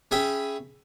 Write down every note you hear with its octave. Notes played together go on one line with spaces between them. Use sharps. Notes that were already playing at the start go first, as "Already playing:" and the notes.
C#4 G#4 E5 G5 B5